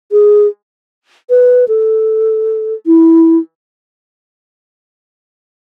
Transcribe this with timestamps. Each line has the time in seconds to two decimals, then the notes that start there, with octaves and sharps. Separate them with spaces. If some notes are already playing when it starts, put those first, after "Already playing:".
0.12 G#4
1.30 B4
1.68 A4
2.86 E4